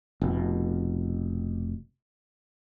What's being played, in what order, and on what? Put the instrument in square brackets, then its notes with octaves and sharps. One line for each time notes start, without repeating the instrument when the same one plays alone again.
[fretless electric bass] F1 B2